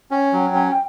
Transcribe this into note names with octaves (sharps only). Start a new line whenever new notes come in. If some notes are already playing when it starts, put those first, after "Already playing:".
C#4 G5
F#3
C#4